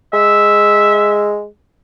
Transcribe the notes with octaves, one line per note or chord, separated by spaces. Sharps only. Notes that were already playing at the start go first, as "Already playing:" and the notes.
G#3 E5